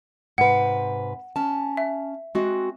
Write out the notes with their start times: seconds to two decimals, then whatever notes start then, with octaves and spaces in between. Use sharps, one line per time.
0.38 G#2 C3 B4 F#5
1.36 C#4 A5
1.77 E5
2.35 G#3 C4 F#4